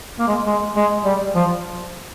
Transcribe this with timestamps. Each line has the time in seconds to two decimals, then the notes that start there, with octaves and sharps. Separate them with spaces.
0.19 A#3
0.28 G#3
0.46 G#3
0.76 G#3
1.05 G3
1.35 F3